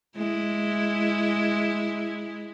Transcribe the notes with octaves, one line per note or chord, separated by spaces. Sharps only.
G#3 E4